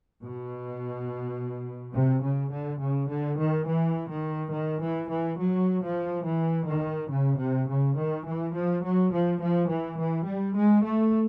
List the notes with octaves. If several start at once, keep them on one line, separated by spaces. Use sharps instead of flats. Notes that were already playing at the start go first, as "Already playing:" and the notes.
B2
C3
C#3
D3
C#3
D3
D#3
E3
D#3
D#3
E3
E3
F#3
F3
E3
D#3
C#3
C3
C#3
D#3
E3
F3
F#3
F3
F3
E3
E3
G3
G#3
A3